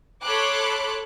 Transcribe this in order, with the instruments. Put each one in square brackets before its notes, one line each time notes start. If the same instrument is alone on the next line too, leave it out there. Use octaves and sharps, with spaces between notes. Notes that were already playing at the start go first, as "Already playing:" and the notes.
[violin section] A4 C#5 B5 C6 D6 F#6